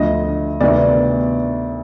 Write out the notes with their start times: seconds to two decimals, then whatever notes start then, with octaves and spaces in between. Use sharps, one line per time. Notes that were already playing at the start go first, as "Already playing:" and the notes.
Already playing: D2 D3 F3 D#5
0.61 D2 C3 D#3 B3 D5